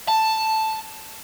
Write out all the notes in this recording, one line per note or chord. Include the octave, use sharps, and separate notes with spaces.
A5